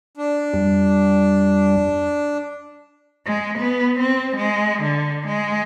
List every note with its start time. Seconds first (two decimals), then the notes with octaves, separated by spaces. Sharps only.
0.17 D4
0.54 F2 G3
3.25 G#3
3.59 B3
4.00 C4
4.36 G#3
4.83 D3
5.27 G#3